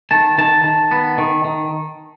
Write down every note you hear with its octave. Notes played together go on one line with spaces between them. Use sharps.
D#3 A5
D#3 A5
D#3 A5
B3
D#3
D#3